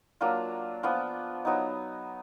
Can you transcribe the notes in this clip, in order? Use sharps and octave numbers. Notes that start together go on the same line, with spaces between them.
F#3 A#3 D4 F4
F3 B3 D4 F4
F#3 B3 D#4